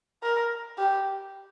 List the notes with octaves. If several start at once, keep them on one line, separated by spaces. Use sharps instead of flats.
A#4
G4